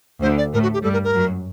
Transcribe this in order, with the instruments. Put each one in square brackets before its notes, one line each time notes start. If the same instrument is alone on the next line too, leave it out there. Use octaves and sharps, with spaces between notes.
[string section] D2 D3 [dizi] C5
[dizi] D5
[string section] A2 A3 [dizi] A#4
[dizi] F#4
G4
[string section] G2 G3 [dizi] A4
[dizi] A#4
A#4
[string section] F#2 F#3